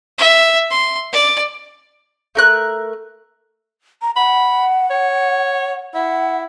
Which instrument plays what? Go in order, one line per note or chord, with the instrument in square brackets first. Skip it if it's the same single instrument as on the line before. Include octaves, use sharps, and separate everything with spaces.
[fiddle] E5
C6
D5
[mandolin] A3 A#4 F#6
[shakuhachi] A#5
[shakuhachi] F#5 [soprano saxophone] B5
[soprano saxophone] C#5
[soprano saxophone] E4 [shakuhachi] F#5